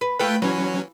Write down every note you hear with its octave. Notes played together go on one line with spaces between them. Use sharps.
B4
A3 F4 A4 B4 G5
E3 F#3 C#4